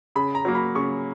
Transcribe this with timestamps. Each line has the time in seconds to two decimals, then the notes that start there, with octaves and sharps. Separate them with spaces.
0.16 C#3 B5
0.35 A#5
0.45 F#3 A#3
0.55 B5
0.75 C#3 C#6